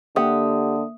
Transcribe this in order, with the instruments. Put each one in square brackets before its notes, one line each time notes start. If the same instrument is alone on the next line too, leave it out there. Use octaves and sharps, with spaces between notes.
[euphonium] D3 [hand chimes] A#3 E5 D#6 [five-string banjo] G4 F#5